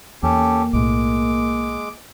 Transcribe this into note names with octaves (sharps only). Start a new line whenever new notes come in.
E2 A#3 C#4 G4 A4
B1 A2 G#3 D6